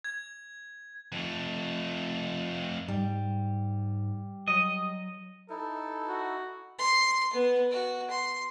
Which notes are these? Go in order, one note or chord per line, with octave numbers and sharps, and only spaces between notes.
G#6
F2 A3
G#2 G3
F#3 D#5
D#4 E4 A4
F#4
C6
B3
F#4
C6